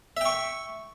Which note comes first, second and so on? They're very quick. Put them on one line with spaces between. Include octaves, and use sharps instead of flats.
E5 G5 C#6